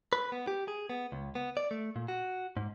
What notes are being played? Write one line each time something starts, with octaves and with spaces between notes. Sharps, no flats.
B4
B3
G4
G#4
B3
C#2
B3
D5
A3
A#2
F#4
G#2